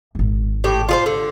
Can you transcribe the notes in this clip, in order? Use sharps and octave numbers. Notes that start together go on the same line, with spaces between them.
D1 G#1
A2 G4
F4 G#4 C5
D3